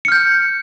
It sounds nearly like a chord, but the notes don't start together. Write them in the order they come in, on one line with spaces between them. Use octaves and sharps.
C#7 F6 G6